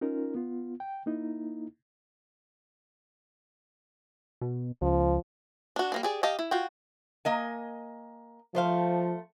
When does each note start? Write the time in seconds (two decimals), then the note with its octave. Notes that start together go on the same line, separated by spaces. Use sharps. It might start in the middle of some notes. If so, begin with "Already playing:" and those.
0.01 C#4 D#4 F4 A#4
0.35 B3 F4
0.80 G5
1.06 A#3 D#4 E4
4.42 B2
4.82 C#2 F3
5.76 D4 F#4
5.92 G3 A#3 D4
6.03 G4 G#4 D5
6.23 G4 D#5 F5 A5
6.39 E4
6.51 F4 F#4 G5
7.25 A#3 D#5 G#5
8.55 F3 A3 C5 F5